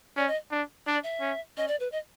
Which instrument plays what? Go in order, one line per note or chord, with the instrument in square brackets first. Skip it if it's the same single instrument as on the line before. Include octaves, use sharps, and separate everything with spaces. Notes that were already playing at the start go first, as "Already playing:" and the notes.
[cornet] C#4 [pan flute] D5
[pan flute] D#5
[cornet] D4
[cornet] D4 [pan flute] D5
[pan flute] E5
[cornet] C#4
[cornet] C#4 [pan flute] D#5
[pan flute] D5
B4
D#5